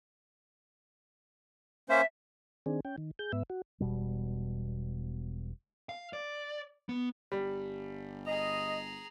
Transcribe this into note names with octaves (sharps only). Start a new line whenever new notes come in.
A#3 C#4 C5 E5
D#3 C4 D4 G#4
C#4 G5
D#3
G#4 G6
G#2 B3 E5
F#4
E1 B2 G3
F5
D5
B3
G1 G3
G#4 D#5 A#5